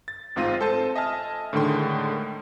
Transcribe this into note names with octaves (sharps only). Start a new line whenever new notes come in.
A6
A1 G#2 C4 F4 A#6 D#7
A4 C5 A5
D#5 E5 G#5 A5 F6
A2 D3 D#3 G#3 G5 C6